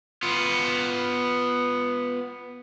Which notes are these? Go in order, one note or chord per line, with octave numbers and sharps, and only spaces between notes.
B3 F4